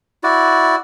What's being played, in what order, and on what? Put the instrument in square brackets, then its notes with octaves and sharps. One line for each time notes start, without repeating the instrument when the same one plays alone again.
[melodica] E4 F#4 D5